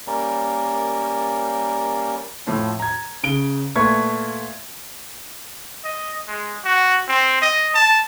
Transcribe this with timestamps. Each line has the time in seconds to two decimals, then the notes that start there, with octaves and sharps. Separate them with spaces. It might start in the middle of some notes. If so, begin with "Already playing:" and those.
0.07 G3 A#3 C#4 A#4
2.47 F2 A2 F3
2.80 A#5 G#6
3.23 C#3 D7 G7
3.75 A#2 A3 B3 C#6 G#6
5.84 D#5
6.28 G#3
6.65 F#4
7.08 C4
7.42 D#5
7.74 A5